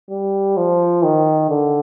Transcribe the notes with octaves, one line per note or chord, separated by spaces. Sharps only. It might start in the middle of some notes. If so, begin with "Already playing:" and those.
G3
F3
D#3
D3